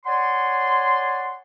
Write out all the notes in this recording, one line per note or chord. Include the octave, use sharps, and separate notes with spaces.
C#5 D5 F#5 G#5 C6